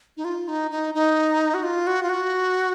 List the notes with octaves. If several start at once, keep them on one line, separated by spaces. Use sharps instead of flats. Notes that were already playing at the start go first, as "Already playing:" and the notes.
D#4
F4
D#4
D#4
D#4
F#4
F4
F#4
F4
F#4